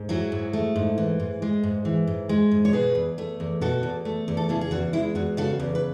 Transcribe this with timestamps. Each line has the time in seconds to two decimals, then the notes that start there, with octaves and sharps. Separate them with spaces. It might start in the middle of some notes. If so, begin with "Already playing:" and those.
Already playing: G#2
0.09 F#3 E4 G#4
0.32 G#2
0.53 A3
0.76 G#2
0.98 E3
1.20 G#2
1.42 G#3
1.63 G#2
1.85 E3
2.07 G#2
2.29 G#3
2.51 G#2
2.65 C#5
2.73 B2 G#4 B4
2.95 E2
3.18 A3
3.40 E2
3.61 B2 F#4 A4
3.83 E2
4.05 A3
4.28 E2
4.37 A4
4.49 C#3 E4 G#4
4.61 G#4
4.71 E2 F#4
4.93 G#3 E4
5.15 E2 F#4
5.37 C#3 F#4 A4
5.59 E2
5.75 B4